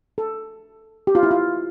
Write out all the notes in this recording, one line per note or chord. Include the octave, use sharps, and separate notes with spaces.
A4
G4
F4
E4
F4